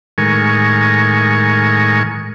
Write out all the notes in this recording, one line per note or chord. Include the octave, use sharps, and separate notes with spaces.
A2 D#3 G#3 A#4 G#5 C#6